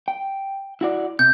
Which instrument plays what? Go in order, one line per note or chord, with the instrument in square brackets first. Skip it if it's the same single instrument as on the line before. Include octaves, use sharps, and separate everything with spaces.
[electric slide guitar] G5
E4 F#4 D5
[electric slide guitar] C3 [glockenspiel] G6